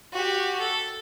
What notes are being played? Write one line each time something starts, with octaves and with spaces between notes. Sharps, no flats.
F#4 G4
A4